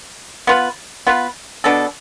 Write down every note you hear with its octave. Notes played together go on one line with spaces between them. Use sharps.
B3 F4 B4
B3 F4 B4
B2 B3 D4 A4